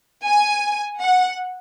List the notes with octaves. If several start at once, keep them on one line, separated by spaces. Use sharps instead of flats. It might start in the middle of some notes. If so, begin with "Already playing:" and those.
G#5
F#5